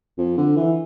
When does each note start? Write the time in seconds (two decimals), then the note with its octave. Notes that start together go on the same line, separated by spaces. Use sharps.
0.18 F2
0.38 D3
0.56 E3